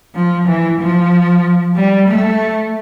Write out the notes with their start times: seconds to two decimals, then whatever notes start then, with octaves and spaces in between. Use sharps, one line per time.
0.15 F3
0.47 E3
0.80 F3
1.76 G3
2.08 A3